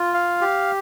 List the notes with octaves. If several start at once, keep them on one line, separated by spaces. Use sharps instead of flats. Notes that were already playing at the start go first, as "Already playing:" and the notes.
Already playing: F4
F5
G4